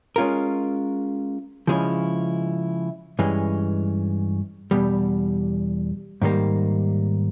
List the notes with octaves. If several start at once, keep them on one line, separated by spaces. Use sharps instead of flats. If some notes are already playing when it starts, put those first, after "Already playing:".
G#3 C#4 F4 A#4
C#3 F3 G#3 C#4 E4
G2 E3 G#3 C#4
E2 B2 G3
G#2 D#3 G3 A#3